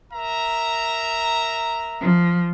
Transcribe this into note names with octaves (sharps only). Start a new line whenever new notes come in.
A#4 E5 A#5
F3